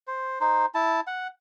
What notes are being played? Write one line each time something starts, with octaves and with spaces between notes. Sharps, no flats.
C5
D#4 C5
E4 A5
F#5